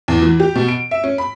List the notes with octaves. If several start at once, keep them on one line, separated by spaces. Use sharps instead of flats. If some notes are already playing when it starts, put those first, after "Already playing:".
E2
E3
G4
B2
D7
E5
C#4
B5